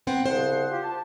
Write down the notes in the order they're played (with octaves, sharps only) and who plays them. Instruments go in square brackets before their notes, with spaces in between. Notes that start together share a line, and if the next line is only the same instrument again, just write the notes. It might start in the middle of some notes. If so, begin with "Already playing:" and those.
[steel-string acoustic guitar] B3 C4 F#5
[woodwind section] C2 C#3 F#5 [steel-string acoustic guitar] C5
[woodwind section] F4 G4
A5